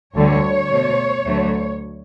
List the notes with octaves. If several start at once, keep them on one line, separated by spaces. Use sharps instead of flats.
D2 D3 G3 C#5
B2 A3
D2 D3 F#3 A3